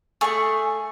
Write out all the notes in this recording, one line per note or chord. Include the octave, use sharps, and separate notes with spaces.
A3 G#4 G#5 C#6